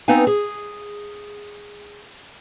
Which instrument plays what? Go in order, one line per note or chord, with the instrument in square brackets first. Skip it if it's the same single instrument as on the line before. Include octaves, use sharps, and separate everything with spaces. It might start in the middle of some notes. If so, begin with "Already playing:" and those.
[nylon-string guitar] B3 C4 D#4 B4 F5 G#5
G#4